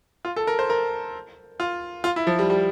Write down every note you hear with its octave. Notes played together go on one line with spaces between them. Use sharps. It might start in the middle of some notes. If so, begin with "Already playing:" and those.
F4
A4
A#4
C5
A#4
F4
F4
E4
F3
G3
G3